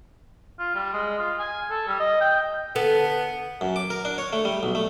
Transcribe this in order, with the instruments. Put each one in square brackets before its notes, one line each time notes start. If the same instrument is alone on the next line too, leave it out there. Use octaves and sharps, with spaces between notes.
[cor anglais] F4
G3
G#3
F4
G#5
A4
G3
D#5
G5
[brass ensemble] D3 F#5 [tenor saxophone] B3 [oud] A4
[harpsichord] F#2
D6
A#4
D4
C#5
A3
G3
B1
A3